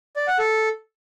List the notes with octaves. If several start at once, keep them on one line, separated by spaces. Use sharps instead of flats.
D5
F#5
A4